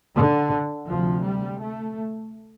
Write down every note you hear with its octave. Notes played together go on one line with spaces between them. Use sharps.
D3
D2 C3 F3
G3
A3